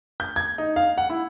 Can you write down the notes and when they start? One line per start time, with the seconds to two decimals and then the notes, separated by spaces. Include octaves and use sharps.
0.20 G6
0.36 G#6
0.58 D#4
0.76 F5
0.98 F#5
1.10 E4